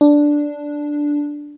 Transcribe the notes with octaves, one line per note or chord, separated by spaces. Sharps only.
D4